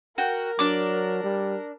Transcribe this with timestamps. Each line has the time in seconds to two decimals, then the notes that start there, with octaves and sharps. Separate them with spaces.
0.18 F#4 A#4 G5
0.59 F#3 D4 D6
1.24 G3